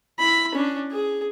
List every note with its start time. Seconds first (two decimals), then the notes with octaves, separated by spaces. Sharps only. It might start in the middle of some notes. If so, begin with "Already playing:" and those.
0.19 E4 B5
0.55 C#4 D4
0.91 G#4